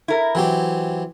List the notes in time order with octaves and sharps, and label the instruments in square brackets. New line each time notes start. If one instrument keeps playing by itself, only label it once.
[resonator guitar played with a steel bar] E4 A#4
[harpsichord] E3 F#3 G4 [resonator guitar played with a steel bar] C4